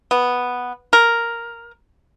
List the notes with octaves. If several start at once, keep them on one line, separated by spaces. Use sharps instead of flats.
B3
A#4